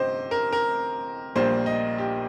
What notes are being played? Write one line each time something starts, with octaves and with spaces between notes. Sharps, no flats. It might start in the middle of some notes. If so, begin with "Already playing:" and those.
Already playing: G1 C3 G4 C5 D#5
A#4
A#4
A#1 A#2 G3 A#3 C5
D#5
G4